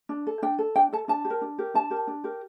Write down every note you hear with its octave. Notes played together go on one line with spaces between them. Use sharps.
D4
A4
D4 G5
A4
D4 G5
A4 A5
D4 A5
G4
A#4
D4
G4 A#4
D4 A5
G4 A#4
D4
G4 A#4